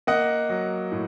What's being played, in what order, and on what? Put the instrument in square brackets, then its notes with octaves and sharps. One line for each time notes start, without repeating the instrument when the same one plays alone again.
[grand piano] A#3 D#5 F#5
F#3
A2